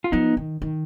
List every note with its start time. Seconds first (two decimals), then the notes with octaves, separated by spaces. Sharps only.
0.04 F4
0.12 F3 B3 D#4
0.37 D#3
0.62 D#3